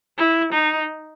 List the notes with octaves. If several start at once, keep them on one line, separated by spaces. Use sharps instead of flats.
E4
D#4